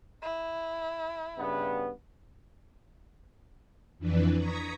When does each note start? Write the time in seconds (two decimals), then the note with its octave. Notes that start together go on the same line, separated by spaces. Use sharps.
0.22 E4
1.38 G2 C#3 B3
3.98 F2 E3 D4 B4
4.37 A#5 C#6 D#6 G#6 A#6 B6